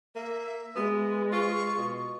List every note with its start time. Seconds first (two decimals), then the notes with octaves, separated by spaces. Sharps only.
0.15 A#3 E5
0.75 G#3 B3
1.32 F4 C#6
1.77 B2